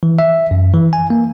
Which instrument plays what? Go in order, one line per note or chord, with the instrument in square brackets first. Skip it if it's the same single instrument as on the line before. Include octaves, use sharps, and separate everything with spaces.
[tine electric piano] E3
E5
F#2
E3
G#5
A#3